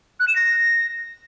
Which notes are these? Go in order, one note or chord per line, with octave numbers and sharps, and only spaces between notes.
F#6
E7
A#6